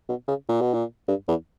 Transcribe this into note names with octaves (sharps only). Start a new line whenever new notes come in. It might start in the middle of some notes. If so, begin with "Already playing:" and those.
B2
C#3
A#2
B2
A#2
G2
E2